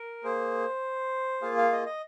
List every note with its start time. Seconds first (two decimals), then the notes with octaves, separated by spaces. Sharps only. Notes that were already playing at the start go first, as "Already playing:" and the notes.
Already playing: A#4
0.24 A#3 G#4 C5
1.42 A#3 F4 G#4 F5
1.57 F5
1.73 D#5
1.86 D#5